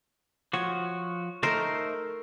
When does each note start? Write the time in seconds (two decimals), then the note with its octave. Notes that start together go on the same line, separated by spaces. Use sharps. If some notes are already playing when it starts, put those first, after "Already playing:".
0.53 F3 F#4 C#5
1.43 A3 D#4 A4 A#4 C5